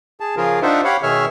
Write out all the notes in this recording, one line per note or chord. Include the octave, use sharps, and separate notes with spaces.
G#4 A5
C#3 F3 F4 G#4 A#4
D4 D#4 F4 C5 E5 F#5
G4 C#5 F5 F#5 B5
B2 D#3 G#4 C#5 E5 F6